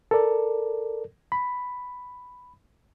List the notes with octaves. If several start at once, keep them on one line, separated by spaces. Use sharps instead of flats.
A4 A#4 D5
B5